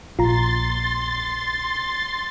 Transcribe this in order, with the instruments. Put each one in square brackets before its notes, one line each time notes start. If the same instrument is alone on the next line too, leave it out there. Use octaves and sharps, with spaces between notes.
[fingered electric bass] A#1 [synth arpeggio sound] F4 A#5 [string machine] C6 A6